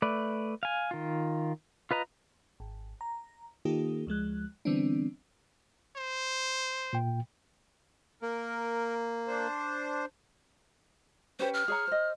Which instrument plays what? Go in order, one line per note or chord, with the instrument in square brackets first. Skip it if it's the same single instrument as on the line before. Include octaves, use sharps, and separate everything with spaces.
[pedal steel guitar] A3 B4 D5
F5 G#5
D#3 F4
F4 B4 D#5 A#5
[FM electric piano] G#1
A#5
D#3 A#3 D#4 F4 G4 A4
D2 F3 G#3 F#6
D3 E3 G3 B3 C4 D4
[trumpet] C5
[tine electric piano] A#2 G5
[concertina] A#3 [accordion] A#4
[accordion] D4 C5
[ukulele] C#4 G4 B4 [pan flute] C5
[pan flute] F6
[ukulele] G#4 C#5 A#5
C5 D#5